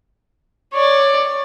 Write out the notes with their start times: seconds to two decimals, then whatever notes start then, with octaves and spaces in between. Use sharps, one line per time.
0.73 C#5 D5